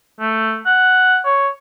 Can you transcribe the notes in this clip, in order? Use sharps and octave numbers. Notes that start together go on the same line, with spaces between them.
A3
F#5
C#5